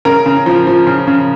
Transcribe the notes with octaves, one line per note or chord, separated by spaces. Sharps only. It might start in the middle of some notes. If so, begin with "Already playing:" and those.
C#3 A#4
C#3
F3
F3
C#3
C#3